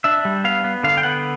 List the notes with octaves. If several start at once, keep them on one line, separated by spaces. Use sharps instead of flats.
D4 E5
G3
B3 F5
B3
D3 F5
G5
B3 F#5